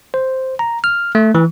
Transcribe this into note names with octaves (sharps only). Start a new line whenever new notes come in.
C5
A#5
F6
A3
E3